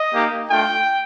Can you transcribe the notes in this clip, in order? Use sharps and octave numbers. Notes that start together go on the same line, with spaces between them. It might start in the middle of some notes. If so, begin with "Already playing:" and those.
Already playing: D#5
A#3 D#4 G4
A3 D4 F4 G5